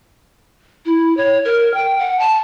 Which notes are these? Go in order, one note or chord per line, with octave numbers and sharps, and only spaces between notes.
E4
C#5
A#4
G5
F#5
A5